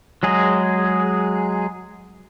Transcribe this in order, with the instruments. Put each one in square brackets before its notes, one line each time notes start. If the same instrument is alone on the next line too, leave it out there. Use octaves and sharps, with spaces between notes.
[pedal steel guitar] F#3 G#3 G#4